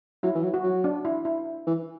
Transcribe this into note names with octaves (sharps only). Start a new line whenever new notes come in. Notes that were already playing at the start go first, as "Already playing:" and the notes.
F#3 E4
E3
F#3
F#4
F#3
D4
E4
E4
E3